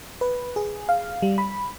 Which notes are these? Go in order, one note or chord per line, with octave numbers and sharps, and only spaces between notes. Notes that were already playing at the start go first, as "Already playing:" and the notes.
B4
G#4
F5
G3
B5